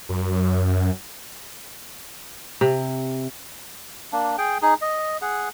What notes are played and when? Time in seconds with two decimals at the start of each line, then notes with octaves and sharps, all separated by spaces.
0.09 F#2
2.61 C3
4.12 A#3 D4
4.38 G#4 G5
4.62 D#4 G#4
4.82 D#5
5.22 G#4 F#5